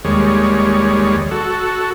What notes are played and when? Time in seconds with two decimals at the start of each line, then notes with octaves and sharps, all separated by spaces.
0.05 D#2 G3 G#3 C#5
1.31 F#4 A4